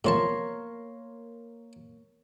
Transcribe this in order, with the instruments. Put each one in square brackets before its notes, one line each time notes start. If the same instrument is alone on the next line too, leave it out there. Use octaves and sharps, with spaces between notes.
[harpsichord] C3 F3 A5 [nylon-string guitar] A#3 [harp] A#4 C#5 C6